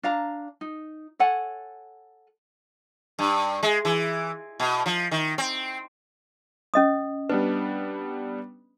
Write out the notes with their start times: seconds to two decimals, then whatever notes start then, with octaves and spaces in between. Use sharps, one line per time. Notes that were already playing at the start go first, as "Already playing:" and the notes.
0.03 D4 F5 A#5
0.61 D#4
1.19 A4 C#5 F#5 G#5
3.19 G2
3.63 G#3
3.85 E3
4.60 B2
4.86 F3
5.11 D#3
5.38 C4
6.74 C#4 D#5 D#6
7.29 G3 B3 D4 B4